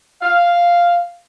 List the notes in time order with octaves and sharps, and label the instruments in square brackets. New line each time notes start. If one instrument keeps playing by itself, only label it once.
[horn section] F5